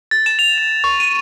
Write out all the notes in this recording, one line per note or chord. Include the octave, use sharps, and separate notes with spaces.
A6
E7
F7
F7
C#6
D#7